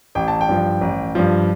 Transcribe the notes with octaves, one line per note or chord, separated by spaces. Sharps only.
A1 G5
A5
G5
G2 F3
A1
G2 F3